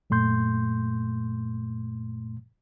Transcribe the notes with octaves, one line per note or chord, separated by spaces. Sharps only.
F#2 A#2 A3 C6 G6